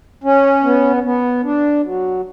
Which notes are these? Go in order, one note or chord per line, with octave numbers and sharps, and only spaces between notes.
C#4
B3
B3
D4
F#3